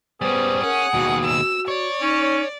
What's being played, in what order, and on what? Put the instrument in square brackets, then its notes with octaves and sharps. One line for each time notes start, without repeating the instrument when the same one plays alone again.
[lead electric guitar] G3 C#4 [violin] B3 [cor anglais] G#4 [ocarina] C5
[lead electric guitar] C#4 [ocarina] A#4 [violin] F#5
[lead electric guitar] D#2 B2 [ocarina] F#4
[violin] E6
[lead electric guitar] C#5 [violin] D5
[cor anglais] C#4 [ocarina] D#4